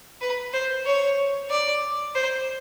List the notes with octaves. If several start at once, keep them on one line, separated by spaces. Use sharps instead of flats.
B4
C5
C#5
D5
C5